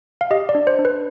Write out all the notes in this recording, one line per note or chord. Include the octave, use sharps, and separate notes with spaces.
F5
G4 D#5
D5
D4
C5
D4
B4